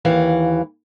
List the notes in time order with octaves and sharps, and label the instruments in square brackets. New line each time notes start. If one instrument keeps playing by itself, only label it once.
[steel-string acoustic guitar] D#2 E3 F5